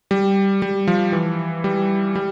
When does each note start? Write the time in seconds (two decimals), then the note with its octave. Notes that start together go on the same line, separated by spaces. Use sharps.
0.11 G3
0.62 G3
0.87 F3
1.12 E3
1.64 G3
2.15 G3